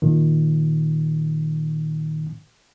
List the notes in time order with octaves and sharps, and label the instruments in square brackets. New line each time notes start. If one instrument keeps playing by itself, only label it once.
[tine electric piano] A#2 D#3